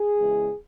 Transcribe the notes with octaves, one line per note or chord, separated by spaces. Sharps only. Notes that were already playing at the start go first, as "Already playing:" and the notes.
Already playing: G#4
E2 C#3 E3 G#3